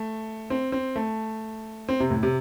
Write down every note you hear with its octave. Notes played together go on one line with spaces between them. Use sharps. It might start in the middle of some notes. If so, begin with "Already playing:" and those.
Already playing: A3
C4
C4
A3
C4
C3
A2
C3